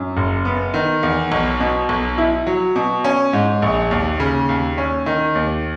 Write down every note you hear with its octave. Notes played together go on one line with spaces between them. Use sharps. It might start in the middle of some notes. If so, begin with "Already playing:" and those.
Already playing: F#2
F#1
B3
D#3
E2
B1
B2
B1
E4
F#3
B2
C#4
G#2
A#1
D#2
C#3
D#2
C#4
D#3
D#2